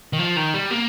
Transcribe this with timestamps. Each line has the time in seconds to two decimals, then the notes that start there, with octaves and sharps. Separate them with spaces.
0.13 D#3
0.19 F3
0.37 D#3
0.54 G3
0.71 A#3